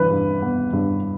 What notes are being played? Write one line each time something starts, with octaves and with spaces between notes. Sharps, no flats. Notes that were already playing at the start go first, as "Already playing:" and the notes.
Already playing: G2 E3 B4
G2
B3
G2